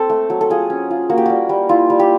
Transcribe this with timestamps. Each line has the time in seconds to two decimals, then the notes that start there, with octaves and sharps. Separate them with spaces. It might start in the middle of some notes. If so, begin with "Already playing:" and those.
Already playing: C4 A4
0.10 A3
0.30 F#3
0.41 A4
0.50 F4 G#4
0.70 C#4
0.91 F4
1.10 A#3 F#4
1.17 G4
1.26 G3 F#4
1.49 G3
1.69 E4 F4
1.90 G3
1.99 G4